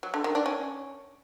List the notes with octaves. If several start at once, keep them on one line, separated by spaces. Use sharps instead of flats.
F#3
D3
D#3
D4
C#4